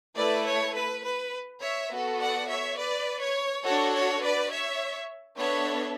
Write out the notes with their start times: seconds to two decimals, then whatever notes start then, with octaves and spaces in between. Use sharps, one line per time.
0.17 A3 E4 A4 B4 D5
0.47 C#5
0.76 B4
1.04 B4
1.62 C#5 E5
1.91 B3 F#4 A4
2.20 D5 F#5
2.49 C#5 E5
2.78 B4 D5
3.21 C#5
3.65 D4 F#4 A4 C#5
3.94 C#5
4.23 B4 D5
4.51 C#5 E5
5.38 B3 D4 A4 C#5 E5